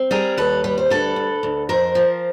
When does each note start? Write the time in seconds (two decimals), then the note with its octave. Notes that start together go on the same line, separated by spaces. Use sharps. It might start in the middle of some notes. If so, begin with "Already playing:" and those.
Already playing: C4
0.11 G3 G#4 A#4
0.37 D#2 A4 B4
0.64 G3 B4
0.78 C5
0.90 D2 A4 B4
1.16 D2
1.43 D2
1.69 F2 A#4 C5
1.95 F3